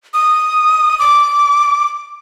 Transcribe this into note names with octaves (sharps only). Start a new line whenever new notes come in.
D#6
D6